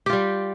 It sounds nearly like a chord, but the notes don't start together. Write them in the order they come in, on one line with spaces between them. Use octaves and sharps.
G4 F4 G3